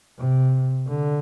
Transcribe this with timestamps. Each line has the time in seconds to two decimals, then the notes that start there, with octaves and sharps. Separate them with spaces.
0.18 C3
0.88 D3